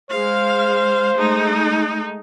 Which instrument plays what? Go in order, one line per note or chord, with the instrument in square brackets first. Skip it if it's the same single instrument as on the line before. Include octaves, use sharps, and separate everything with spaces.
[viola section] G#3 F5 [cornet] C5
[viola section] G#3 A3 D#4